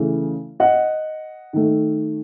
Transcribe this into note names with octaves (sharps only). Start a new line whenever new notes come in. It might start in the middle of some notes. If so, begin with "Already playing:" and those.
Already playing: C#3 E3 A3
D#5 F#5
D#3 A3